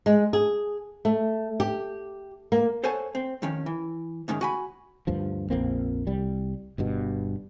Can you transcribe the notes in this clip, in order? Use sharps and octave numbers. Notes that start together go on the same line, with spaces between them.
G#3
G#4
A3
G4
A#3
A4 C5 C#5 F#5 G#5 A5
C4
F2 D#3 C#4
E3
D2 G#2 D#3 C#4
F#4 G#5 B5
D2 G2 F3
A#1 F2 A#3 C4
C2 G3
G1 G2 B2